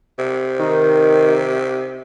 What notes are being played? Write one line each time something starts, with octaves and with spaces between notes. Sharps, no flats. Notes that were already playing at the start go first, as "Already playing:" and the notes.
C3
D#3